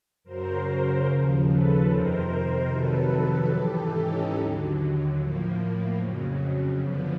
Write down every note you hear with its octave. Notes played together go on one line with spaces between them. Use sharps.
F#2 C#3 F#3 A#4 C5
A#4 C5
D#2 C#3 F3
A4 B4
F2 C3 D#3 A#4 C5
F2 C3 D#3 F#3 A4 B4
G#2 E3 G4 A4
C#4 D#4
D#2 D3 F#3
A2 F3 A#3
F2 C#3 F#3
F#2 D3 F3 B3